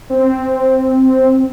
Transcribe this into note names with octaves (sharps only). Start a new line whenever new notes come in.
C4